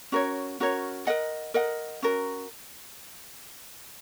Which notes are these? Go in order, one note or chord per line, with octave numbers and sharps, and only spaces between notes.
C#4 F#4 A#4 C#5
C#4 F#4 A#4 C#5
A#4 D#5 F#5
A#4 D#5 F#5
C#4 F#4 A#4